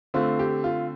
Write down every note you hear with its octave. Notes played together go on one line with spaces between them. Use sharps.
D3 A3 C4 F4
G4
F4